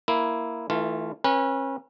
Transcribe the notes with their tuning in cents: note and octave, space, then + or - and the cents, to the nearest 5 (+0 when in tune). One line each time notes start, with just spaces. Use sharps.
A#3 +0 E4 +0
E3 -30 A3 +0 F4 -10
C#4 -35 B4 -35